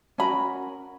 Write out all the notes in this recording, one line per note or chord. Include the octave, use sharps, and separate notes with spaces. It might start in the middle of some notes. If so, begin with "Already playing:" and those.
C#4 F#4 A#4 B5